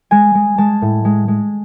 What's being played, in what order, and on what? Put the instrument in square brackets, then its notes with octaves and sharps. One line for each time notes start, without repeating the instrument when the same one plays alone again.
[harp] G#3 G#5
G#3
G#3 A5
A2
G#3
G#3